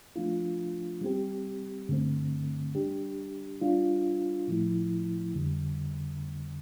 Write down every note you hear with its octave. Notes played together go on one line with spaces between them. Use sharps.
F3 A3 D4 F4
G3 C4 G4
G2 D3 A3 C4
G3 D4 G4
G3 D4 F4
A2 F3 A3 E4
F2 D3 G3